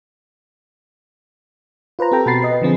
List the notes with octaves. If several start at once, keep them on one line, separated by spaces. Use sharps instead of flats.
F4 B4 C5 A#5
C4 G4 A4 G5 A#5
B2 F#4 B5 A6 C7
B4 D#5
D3 F3 C4 G#4